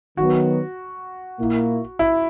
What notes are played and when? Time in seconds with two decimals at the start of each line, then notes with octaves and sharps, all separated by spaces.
0.17 D#3 F#3 B3 F#4
1.38 A#2 A#3 E4
1.99 E4